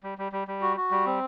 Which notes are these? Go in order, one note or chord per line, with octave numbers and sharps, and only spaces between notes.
G3
G3
G3
G3
F#4
F#4
G3
C4